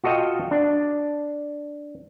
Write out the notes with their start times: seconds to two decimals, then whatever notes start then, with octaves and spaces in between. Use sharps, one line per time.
0.04 F4 F#4 A4 D#5 F5 G5
0.51 D4